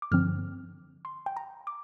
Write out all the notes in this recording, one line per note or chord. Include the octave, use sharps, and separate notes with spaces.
D6
G2 D3 F3 C4 F6
C6
G5
A#5
D6